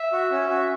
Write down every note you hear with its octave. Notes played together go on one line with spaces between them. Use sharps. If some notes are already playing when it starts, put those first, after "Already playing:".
Already playing: E5
F#4
C#4
F#4